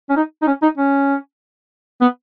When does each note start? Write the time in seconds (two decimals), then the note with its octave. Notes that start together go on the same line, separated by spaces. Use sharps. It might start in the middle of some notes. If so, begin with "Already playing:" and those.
0.10 C#4
0.16 D#4
0.42 D#4
0.47 C#4
0.62 D#4
0.78 C#4
2.01 B3